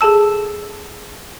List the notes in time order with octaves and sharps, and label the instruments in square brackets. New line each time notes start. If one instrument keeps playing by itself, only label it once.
[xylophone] G#4 A4 A5 E6